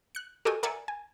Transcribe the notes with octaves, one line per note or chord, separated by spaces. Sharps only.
F#6 C#7
F#4 G4 A4 D#5 G5 G#5
A#4 D5 E5 F#5 G#5
G#5